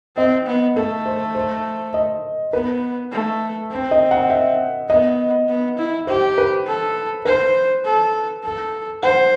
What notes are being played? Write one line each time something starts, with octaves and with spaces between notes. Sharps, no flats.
C4 D#5
B3
A3 A4
C5
C5
D#5
B3 B4
A3
C4
D#5
F#5
E5
B3 D#5
B3
E4
G4 C5
B4
A4
B4 C5
A4
A4
C5 F#5